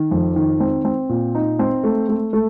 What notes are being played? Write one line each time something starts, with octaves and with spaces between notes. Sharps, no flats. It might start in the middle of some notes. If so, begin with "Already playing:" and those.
Already playing: D#3
F2
D#3
C4
C4
A#2
D#4
C4
A3
A3
A3